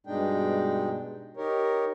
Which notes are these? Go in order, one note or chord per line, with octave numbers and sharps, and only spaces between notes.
G2 B2 G#3 D4 D#4 G5
D#4 G4 A#4 C#5